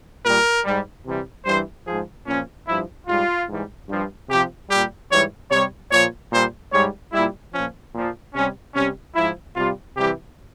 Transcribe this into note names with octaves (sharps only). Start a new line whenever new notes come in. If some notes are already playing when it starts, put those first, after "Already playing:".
A#2 G3 A#4
G#2 G3
C3 E3 G3
G2 E3 G3 C5
G#2 F3 G#4
A#2 F3 C#4
G2 F3 E4
G#2 G3 F4
G#2 E3 G3
G2 F3
C3 F3 G4
A#2 G3 G4
G#2 E3 G3 C#5
C3 G3 C#5
A#2 F3 C#5
A#2 G3 C5
G#2 G3 C#5
A#2 G3 E4
A#2 F3 C#4
A#2 F3
C3 G3 C#4
C3 G3 C#4
G#2 F3 E4
C3 G3 F4
C3 E3 G3 G4